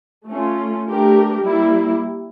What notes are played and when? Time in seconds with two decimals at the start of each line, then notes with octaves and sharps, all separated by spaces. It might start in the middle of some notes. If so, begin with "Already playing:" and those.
0.27 A3 C#4 F4
0.86 A3 D4 G4 A#4
1.44 G3 A#3 E4